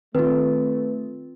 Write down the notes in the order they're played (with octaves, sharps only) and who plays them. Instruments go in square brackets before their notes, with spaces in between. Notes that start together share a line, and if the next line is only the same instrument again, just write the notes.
[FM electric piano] D#3 [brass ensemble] A3 [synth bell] C4 F4 [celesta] B4